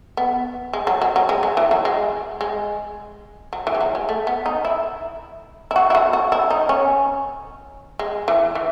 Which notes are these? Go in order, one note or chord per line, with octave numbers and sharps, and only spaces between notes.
B3
G#3
F#3
F#3
F#3
G#3
F#3
E3
F#3
G#3
G#3
F#3
E3
G#3
F#3
G#3
A3
B3
D#4
E4
E4
F#4
E4
F#4
F#4
E4
D#4
C#4
G#3
E3
E3